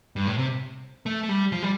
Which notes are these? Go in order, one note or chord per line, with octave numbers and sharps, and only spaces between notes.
G2
A2
C3
A3
A3
G3
F3
G3